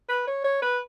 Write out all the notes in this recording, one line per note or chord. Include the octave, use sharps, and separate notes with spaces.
B4
C#5
C#5
B4